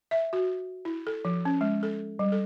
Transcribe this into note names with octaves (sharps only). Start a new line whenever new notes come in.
E5
F#4
E4
A4
F3
C#4
G#3
A4
G3
A4